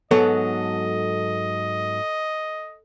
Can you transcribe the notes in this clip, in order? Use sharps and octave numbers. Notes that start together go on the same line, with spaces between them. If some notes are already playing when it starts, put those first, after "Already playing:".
G#2 F#3 B3 A4 D#5